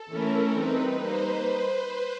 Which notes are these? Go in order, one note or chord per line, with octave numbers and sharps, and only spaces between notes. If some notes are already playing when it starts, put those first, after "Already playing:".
Already playing: A4
E3 A3 C#4 E4 A#4
G3 C4 D#4 B4
G3 A#3 D#4 C5